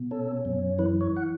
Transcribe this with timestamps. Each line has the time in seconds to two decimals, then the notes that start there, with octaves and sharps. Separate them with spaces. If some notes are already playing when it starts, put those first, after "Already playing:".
Already playing: B2
0.11 C#4 A4
0.45 F#2
0.79 E3 B4
1.01 C#5
1.16 F#5